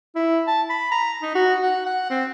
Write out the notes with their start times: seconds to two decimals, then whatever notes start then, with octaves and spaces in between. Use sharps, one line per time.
0.16 E4
0.47 A5
0.70 B5
0.91 A#5
1.22 D#4
1.35 F#4
1.63 F#5
1.86 F#5
2.10 C4